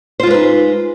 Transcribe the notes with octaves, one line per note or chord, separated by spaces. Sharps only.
G#3 D#4 F4 B4 C5